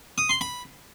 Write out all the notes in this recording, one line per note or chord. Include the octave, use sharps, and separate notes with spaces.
D#6
C6
B5